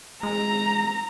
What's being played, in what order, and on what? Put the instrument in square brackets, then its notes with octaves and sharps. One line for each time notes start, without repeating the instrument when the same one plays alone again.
[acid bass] G#3 [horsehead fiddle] A#5